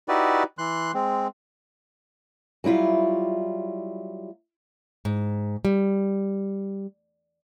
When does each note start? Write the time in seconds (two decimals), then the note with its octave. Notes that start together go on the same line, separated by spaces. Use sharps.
0.08 D#4 E4 F#4 G4 B4 D5
0.58 E3 C6 F#6
0.94 G#3 C4
2.64 F#3 G3 E4 F4
5.05 G#2
5.65 G3